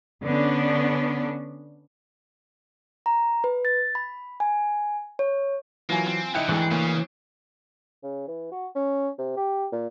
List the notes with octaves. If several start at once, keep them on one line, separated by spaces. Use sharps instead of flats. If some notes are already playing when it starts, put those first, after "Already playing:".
D3 B3 C#4 D4
A#5
B4
A6
B5
G#5
C#5
E3 F#3 A#3 F4 G#5
C4
D3 F#3 D#4 E4 G5 F#6 C#7
D2 G#2 E3 G#3
D2 C#3 A#3
C#3
E3
F#4
C#4
C3
G4
A#2